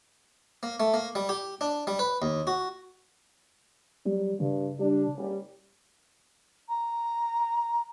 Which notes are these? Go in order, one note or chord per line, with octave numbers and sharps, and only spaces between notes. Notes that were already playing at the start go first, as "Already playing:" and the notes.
A#3
A3
A#3
G3
G4
D4
G3
B4
D#2
F#4
F#3 G3
G2 C#3
G3 D4
F#1 G3 C#4
A#5